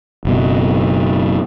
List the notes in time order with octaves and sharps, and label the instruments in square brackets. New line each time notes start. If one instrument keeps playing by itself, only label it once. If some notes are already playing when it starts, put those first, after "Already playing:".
[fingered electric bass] F#1 F#2 B2